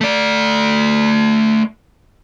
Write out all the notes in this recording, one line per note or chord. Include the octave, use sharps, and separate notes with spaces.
A3 D5